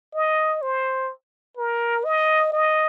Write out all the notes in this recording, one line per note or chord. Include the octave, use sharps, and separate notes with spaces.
D#5
C5
A#4
D#5
D#5